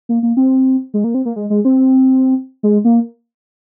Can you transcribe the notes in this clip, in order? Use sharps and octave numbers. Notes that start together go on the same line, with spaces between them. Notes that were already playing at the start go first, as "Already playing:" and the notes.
A#3
A#3
C4
G#3
A#3
C4
A#3
G#3
G#3
C4
G#3
A#3